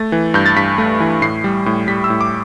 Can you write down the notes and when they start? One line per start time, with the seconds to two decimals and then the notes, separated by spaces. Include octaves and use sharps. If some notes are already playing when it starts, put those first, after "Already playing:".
Already playing: A3 A6
0.12 E3
0.34 G2 G6
0.46 A6
0.56 G2 B6
0.78 A3
1.00 E3
1.22 A2 C7
1.44 G3
1.66 A2
1.88 G3 B6
2.04 E6
2.10 A2
2.21 D6